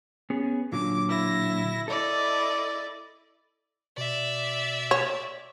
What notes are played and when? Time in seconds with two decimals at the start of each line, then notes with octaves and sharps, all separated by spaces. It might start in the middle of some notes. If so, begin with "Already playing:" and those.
0.30 B3 C#4 G#4
0.72 A#2 D3 F#3 D6
1.08 E4 A#6
1.88 E4 A4 D5 D#5
3.97 B2 D5 E5
4.91 C#5